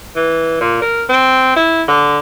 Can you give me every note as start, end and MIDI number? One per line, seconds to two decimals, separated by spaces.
0.16 0.56 52
0.60 0.80 46
0.82 1.04 70
1.09 1.56 60
1.56 1.83 64
1.88 2.18 50